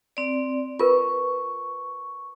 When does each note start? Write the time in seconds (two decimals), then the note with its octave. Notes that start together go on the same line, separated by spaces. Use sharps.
0.17 C4 D5
0.79 F4 A#4 B4 C#6